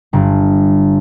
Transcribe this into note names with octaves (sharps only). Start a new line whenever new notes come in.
G1